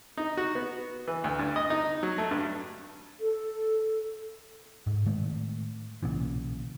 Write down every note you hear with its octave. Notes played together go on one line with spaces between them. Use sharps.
D#4
F#4
B3
E3
D2
G2
D#5
D#4
F#3
A3
G2
A4
G#2
A2 D#3 G#3 A3
B1 A#2 C#3 E3